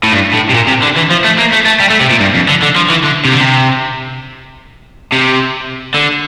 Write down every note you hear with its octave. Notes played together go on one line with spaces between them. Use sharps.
A2
G2
A2
C3
A#2
C3
D3
E3
F3
A3
A#3
A3
A3
G3
A3
C3
A#2
G2
F2
D3
D3
F3
E3
D3
C3
D3
C3
C3
D3